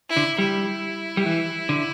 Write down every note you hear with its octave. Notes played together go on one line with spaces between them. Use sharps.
E4
D3
G3 E4
G3
E3
D3